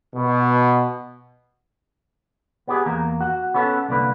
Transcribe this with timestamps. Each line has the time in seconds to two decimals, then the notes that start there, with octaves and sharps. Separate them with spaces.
0.15 B2
2.68 B3 G4 G#4
2.86 E2 A#3 A#5
3.21 F#4
3.54 B3 C#4 A4
3.88 C2 D3 A#3 B4